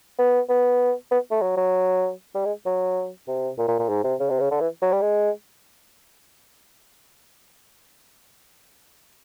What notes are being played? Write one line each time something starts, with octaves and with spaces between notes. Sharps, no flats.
B3
B3
B3
A3
F#3
F#3
G3
G#3
F#3
C3
A#2
A#2
A#2
G#2
C3
C#3
C3
C#3
D3
E3
F#3
G3
G#3